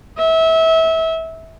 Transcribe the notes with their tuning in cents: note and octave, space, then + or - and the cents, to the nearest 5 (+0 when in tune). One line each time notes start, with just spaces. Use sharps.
E5 -25